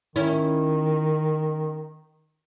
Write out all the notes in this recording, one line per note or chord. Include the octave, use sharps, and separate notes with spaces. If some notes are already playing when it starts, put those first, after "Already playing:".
D#3 C#4 E4